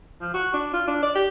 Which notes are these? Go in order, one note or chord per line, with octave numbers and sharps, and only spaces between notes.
F3
F#4
D4
F4
D4
D5
G4